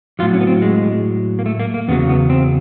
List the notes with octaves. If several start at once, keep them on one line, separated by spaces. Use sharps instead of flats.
A2 F#3 F4
C#4
B3
C4
G#3
A#3
A3
A#3
A#3
E2 C#3 F#3 B3
B3
C4